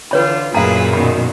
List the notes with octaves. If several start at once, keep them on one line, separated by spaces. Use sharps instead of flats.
D3 E3 F4 B4 C#5 B5
F#2 A#2 G#4 A#4 B4 F5 A#5
B2 D#3 B5